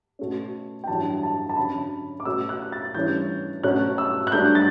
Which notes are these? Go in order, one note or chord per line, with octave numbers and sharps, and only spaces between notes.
B2 A3 C#4
G5
F#2 E3 G3 D4 A5
A5
A5
D3 F#3 C#4 B5
D6
B2 A3 C#4 E6
F#6
A6
G2 E3 A3 C#4 G6
B2 F#3 A3 C#4 F#6
E6
F#6
G2 F#3 A3 D4 G6
A6